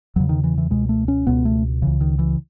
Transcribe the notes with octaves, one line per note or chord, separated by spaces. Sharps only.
E2 C#3 F#3
D#3
E3
E3
C#2 B2 G#3
A3
C#4
C#2 B2 B3
A3
C#2 C#3 E3
D#3
E3